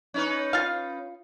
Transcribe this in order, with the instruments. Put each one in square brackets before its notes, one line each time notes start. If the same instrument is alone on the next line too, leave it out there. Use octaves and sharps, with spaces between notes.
[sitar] C#4 D#4 B4
[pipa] F4 F5